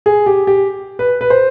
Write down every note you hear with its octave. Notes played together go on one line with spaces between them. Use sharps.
G#4
G4
G4
B4
B4
C5